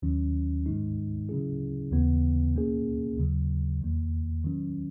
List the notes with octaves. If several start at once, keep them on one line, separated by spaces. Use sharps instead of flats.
D#2 D#3 F#3 C#4
G#2 D#3 G#3 D#4
C#3 F#3 C#4 E4 G#4
D#2 C#3 E3 B3
B2 A#3 C#4 G#4
D#2 C#3 F#3
E2 D#3 A#3
D#3 F#3 C#4